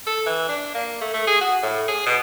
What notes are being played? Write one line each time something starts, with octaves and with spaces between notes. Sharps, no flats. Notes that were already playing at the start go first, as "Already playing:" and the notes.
A4
E3
D4
A#3
A3
A3
G#4
F#4
A2
G#4
B2